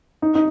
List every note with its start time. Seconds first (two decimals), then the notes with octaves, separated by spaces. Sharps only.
0.22 D#4
0.35 D#4